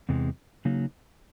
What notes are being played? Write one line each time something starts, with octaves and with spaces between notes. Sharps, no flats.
E2 C3 E3 G#3
C#3 F#3 A#3 D#4